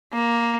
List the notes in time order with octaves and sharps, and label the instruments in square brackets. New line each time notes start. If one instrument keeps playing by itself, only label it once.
[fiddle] A#3